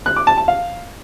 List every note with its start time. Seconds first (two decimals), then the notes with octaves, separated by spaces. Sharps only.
0.06 F#6
0.16 D6
0.27 A5
0.37 A5
0.48 F5